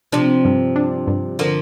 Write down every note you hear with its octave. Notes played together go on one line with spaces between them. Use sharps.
C3 F3 D4
G2
D4
G2
D3 F3 A#3